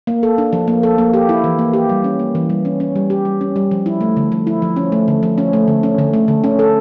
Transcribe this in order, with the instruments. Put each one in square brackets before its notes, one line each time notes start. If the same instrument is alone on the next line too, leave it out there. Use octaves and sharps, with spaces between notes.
[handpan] A#3
A4
D4
F3
A#3
A4
A#3
G4
E4
E3
A#3
G4
G3
C#4
A#3
E3
G3
C#4
C#4
G3
G4
G3
C#4
G3
F3
E4
A3
D3
F3
E4
F3
C#4
A3
D3
F3
C#4
A3
D3
C#4
D3
A3
D3
C#4
A4